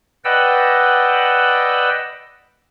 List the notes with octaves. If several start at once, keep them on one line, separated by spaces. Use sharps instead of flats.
B4 D5 D#5 F#5 G5 E6